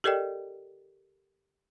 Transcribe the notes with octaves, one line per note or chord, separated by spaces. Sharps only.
G4 A4 A#4 D5 D#5 G5